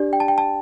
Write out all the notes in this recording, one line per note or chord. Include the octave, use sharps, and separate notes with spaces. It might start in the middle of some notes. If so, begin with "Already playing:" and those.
Already playing: D4 G4 D5
G5
A5
G5
A5